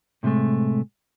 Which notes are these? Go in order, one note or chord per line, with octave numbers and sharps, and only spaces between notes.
A2 C3 F3 G#3 A3